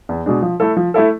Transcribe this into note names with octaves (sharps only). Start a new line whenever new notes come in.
E2
B2 G#3 D4
F3
A3 E4 A4
F3
A3 E4 A4